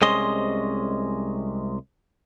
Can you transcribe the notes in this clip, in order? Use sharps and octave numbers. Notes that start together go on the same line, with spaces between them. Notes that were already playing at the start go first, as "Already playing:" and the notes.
C2 C3 G#3 C#4 D#5 C6